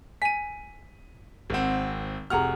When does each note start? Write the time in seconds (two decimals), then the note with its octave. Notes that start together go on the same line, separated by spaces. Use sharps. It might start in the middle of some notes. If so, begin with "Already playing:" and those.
0.22 G#5 B6 D#7
1.50 G#1 C4 A#4 F#5
2.30 F1 F#4 G#4 F#5 A#5 F6